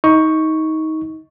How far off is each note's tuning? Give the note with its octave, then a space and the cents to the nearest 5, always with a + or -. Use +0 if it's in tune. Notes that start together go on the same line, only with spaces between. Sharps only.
D#4 +20 C#6 +0